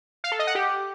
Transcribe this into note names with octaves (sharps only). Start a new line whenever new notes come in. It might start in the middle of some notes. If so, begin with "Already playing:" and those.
F5
A4
D#5
F#5
G4